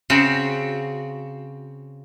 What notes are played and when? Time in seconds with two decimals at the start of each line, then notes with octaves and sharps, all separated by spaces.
0.10 C#3 C4 F#4